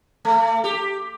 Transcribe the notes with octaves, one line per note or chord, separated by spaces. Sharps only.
A3
G4